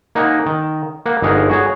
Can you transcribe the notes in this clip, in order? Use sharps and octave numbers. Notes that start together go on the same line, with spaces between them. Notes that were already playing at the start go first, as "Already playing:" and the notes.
A#3 D#4 F#5 G#5 A#5
D#3
A#3 F#5
G1 D#4 G#4 A#4 F#5 A#5
F#4 G#4 C#5